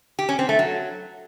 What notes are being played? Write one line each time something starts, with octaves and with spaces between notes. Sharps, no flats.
G4
C#4
C4
A3
F#3